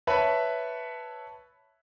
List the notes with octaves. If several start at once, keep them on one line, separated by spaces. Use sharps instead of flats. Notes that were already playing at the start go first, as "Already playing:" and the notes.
B4 C#5 E5 A5 B5